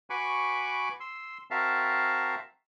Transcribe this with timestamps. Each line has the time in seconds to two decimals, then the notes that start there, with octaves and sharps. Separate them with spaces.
0.10 F#4 B4 G#5 B5 C#6 D6
1.00 C6 E6
1.51 C4 F#4 A#4 E5 F5 A5